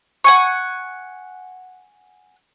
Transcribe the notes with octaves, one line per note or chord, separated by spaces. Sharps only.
F#5 G#5 C#6